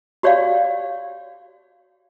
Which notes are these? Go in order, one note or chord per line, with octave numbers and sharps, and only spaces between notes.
F#4 G4 C#5 D5 F5